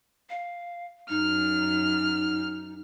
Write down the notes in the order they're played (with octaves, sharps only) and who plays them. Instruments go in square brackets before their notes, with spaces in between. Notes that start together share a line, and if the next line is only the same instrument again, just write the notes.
[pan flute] F5
[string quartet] F#2 F6 [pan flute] D#4